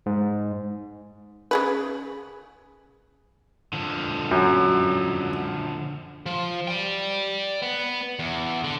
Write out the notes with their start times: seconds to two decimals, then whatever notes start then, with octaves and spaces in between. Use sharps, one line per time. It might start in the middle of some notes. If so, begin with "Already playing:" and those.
0.06 G#2
1.51 C#3 G#4 B4
3.73 D3 F3
4.31 F#2
6.26 F3
6.68 D5 G5
7.62 B3
8.19 E2
8.64 D3